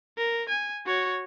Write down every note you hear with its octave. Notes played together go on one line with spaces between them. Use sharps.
A#4
G#5
F#4 C#5